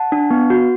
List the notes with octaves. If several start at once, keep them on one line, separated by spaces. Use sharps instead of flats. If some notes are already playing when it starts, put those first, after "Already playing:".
Already playing: F#5 A5
D4
B3
F#4